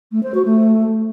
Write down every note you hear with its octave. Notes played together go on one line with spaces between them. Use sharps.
A3
C5
F#4
A3